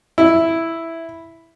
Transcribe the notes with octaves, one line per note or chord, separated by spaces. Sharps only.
E4